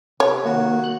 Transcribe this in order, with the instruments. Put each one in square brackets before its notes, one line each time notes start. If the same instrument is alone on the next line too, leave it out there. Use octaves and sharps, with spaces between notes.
[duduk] C3 [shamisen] C#5
[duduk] D#3 [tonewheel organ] A#3 [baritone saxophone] F#4
[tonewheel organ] F#6